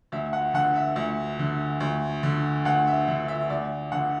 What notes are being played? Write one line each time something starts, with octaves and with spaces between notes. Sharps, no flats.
D2 E5
F#5
D3 F#5
E5
D2
D3
D2
D3
D2 F#5
E5
D3 E5
E5
D2 D5
D3 F#5